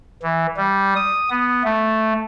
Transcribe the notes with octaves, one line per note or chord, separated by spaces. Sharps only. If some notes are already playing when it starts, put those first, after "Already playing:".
E3
G3
D#6
B3
A3